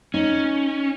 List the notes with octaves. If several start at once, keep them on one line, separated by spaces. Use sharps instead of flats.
C#4 D#4